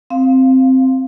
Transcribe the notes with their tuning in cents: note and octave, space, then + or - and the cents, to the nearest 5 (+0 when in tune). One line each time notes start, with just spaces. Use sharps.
C4 +0 F5 +5